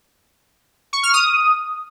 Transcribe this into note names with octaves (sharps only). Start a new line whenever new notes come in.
C#6
F6
D#6